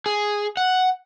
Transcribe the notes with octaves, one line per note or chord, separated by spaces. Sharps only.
G#4
F#5